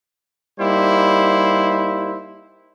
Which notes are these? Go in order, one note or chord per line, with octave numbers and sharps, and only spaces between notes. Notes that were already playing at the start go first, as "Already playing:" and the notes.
G3 A#3 D#4 E4 C5